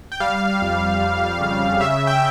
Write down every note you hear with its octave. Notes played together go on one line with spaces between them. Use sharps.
G5
G3 F5
F2
F2
C#3
C#3 E5
G5